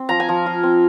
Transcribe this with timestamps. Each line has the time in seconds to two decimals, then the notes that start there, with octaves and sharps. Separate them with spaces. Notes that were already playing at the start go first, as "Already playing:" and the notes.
Already playing: C4
0.09 F3 A#5
0.20 G#5
0.29 F3
0.46 F4
0.63 C4